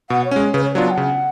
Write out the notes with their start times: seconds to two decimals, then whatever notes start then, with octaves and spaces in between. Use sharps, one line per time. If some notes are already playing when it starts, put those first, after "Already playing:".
0.10 B2 F#5
0.24 C#5
0.31 G#3 C#4
0.54 C#3 B4
0.64 C#5
0.75 F#3 B3 D4 F4 D5
0.86 A5
0.91 F#5
0.97 C#3